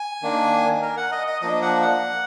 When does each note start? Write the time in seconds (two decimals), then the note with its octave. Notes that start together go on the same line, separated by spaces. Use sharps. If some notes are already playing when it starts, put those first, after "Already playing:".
Already playing: G#5
0.22 D#3 A#3 D4
0.82 A#4
0.97 F#5
1.12 D#5
1.27 D#5
1.42 F3 A#3 D4 D#5
1.62 F#5
1.82 F#5